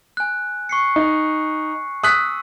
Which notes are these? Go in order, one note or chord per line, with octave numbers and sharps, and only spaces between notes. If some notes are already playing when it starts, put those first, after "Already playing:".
G#5 F#6
C#6 C7 C#7
D#4
D#6 E6 F#6 B6